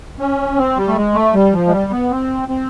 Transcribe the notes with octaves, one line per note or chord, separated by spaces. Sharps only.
C#4
C4
G3
A3
G#3
A3
G3
F3
G#3
G3
B3
C4
C4